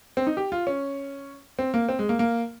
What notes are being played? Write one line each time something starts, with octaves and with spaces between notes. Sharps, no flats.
C4
D#4
G4
F4
C#4
C4
A#3
C4
G#3
A#3
A#3